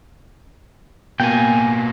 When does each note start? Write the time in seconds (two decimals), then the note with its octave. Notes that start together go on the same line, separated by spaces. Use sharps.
1.20 B2 A#3 G5 G#5